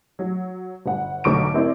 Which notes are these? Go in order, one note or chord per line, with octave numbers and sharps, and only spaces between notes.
F#3
G1 F#5
B1 G#2 D3 C#6 D6 D7
C4 E4 A#4 C5 D5